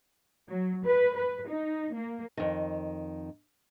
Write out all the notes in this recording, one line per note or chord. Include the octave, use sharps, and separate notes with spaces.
F#3
B4
B4
D#4
A#3
F2 D#3